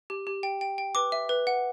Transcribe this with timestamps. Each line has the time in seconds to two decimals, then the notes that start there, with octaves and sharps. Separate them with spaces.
0.10 G4
0.27 G4
0.43 G5
0.61 G5
0.78 G5
0.95 B4 D6
1.12 E5
1.29 B4
1.47 F#5